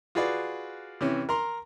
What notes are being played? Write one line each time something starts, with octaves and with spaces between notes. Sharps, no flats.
F4 F#4 G#4 B4 D5
C3 E3 C#4
A#4 A#5 C6